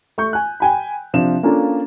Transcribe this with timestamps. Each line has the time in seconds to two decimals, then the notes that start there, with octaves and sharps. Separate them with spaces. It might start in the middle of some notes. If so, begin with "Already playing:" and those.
0.18 A3 C#6 G6
0.33 G#5 F#6
0.60 G5 G#5 B5
1.14 C3 F3 D4 E7
1.43 A#3 C#4 D4 F4 A4